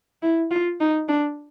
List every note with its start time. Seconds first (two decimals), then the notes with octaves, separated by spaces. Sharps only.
0.23 E4
0.51 F4
0.80 D#4
1.09 D4